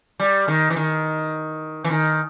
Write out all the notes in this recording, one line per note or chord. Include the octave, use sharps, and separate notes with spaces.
G3
D#3
E3
D#3
E3
D#3